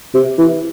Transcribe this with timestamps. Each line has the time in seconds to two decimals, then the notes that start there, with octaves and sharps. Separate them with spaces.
0.14 C3
0.38 E3